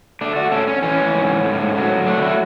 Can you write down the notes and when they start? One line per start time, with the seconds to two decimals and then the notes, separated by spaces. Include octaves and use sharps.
0.21 A3 D4
0.36 F#4
0.52 C#4 A4
0.67 C#4
0.82 E3 C#4
1.14 G#2
1.44 A2
1.76 F#3
2.06 A3 D4
2.22 E4